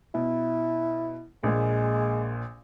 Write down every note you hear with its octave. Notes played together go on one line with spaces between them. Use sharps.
B2 E4
A#1 A#2 G#3